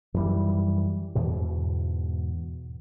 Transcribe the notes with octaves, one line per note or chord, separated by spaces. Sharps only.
F#2 D#3 E3 G3
E2 G#2 B2